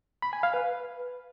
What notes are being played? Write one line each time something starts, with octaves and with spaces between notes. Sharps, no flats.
B5
G#5
F5
B4